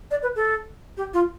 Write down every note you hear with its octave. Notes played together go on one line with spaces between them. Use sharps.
D5
B4
A4
G4
F4